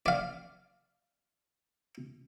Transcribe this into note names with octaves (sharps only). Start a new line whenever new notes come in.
D5 F5